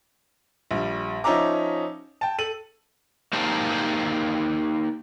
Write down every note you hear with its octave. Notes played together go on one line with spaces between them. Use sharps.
A#1 G3
F3 C#4 D#4 E5 A#5 D6
G5 A5
A4 D#7 F#7
A#3 D#4 G4 C5 A5